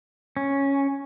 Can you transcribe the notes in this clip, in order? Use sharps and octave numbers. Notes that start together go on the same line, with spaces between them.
C#4